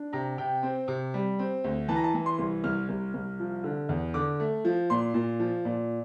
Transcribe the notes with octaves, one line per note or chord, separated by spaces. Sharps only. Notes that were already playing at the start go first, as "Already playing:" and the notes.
Already playing: D4
C3 A#5
C3 G5
C4
C3
G3
C4
D2
E3 A5
A#5
A5
E3
C6
C2
C2 F6
C2
C2
F3
D3
E2
D3 D6
A3
F3
A#2 C6
A#2
F3
A#2